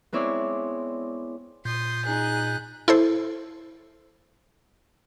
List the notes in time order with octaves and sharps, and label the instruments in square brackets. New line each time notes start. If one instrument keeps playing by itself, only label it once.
[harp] G#3 B3 C4 E4 C#5 D5
[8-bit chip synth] A#2 G6 [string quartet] C6 D#6
[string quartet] D#4 G#4 F#6
[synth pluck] E4 A4 C5